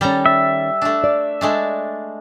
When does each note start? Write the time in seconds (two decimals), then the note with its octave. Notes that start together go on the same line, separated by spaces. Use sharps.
0.01 D#3 G3 C#4 A4 A#5
0.26 E5
0.82 A3 D4
1.04 D5
1.41 G#3 A3 D4